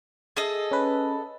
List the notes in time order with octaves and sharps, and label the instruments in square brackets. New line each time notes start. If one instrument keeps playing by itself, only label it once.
[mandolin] G#4 A4 D#5
[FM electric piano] C#4 B4